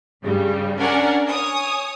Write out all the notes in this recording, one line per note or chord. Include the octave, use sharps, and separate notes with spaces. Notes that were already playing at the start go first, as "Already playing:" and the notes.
G2 C#3 G3
C#4 D4 A#4 D5 F#5 G#5
C#5 G#5 D#6